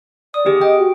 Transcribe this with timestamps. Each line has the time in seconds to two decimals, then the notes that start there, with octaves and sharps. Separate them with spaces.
0.34 D5 D#6
0.46 D#3 B3 G4 G#4
0.61 D#5 G5
0.78 F#4